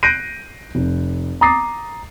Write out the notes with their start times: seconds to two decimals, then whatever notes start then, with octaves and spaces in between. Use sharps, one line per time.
0.03 F#6 G6 A#6 C7 D7 D#7
0.75 F1
1.41 A#5 D6 D#6 A6 C7